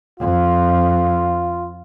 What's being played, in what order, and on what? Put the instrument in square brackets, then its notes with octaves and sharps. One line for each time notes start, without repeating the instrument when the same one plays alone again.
[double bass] F2 [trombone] F4